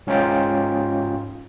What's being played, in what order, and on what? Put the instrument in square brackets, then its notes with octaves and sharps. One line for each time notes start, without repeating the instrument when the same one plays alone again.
[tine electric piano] G#2 C#4 D#4 F4 G5